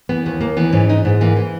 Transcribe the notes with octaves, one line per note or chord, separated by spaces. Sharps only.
E3 B3
D#2 B3
D#2 A#3
E3 B3
G#2 C#4
E3 D#4
G#2 B3
E3 A#3
E3